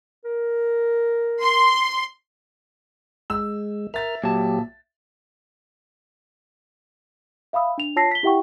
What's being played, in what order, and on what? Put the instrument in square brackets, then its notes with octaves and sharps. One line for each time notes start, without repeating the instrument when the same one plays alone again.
[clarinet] A#4
[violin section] C6
[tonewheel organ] G#3 [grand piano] E6
[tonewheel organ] A#4 F6 [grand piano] E5 A6
[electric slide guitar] A#2 A5 [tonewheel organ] F#3 G4
[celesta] E5 F5 B5 D#6 E6
D4 F7
F4 C#5 A5 E6 A#6 C7
B6 G7
E4 G4 E5 F#5 G5 C#6